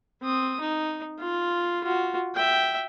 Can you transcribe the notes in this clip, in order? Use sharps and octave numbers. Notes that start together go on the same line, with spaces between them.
C4 D#6
D#4
F4
F4 F#4
E5 G5